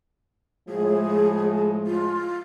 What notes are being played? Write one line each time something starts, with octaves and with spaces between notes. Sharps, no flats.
A2 F3 G#3 G#4
F4